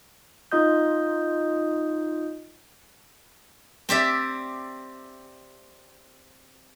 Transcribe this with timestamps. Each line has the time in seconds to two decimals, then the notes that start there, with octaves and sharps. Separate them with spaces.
0.52 D#4 F4 D#5 D#6 G6
3.89 C4 G4 D5 E5